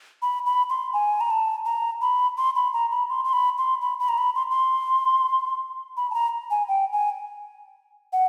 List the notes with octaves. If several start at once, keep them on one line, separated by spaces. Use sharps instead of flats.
B5
B5
C6
G#5
A#5
A5
A#5
B5
C6
B5
A#5
B5
C6
C6
B5
C6
B5
B5
A#5
B5
C6
C6
B5
A5
A#5
G#5
G5
G#5
F#5